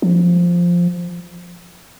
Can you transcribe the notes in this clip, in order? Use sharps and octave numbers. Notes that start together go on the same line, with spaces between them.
F3